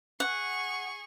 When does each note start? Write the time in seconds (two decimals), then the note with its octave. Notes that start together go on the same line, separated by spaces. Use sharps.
0.20 G#4 F#5 C#6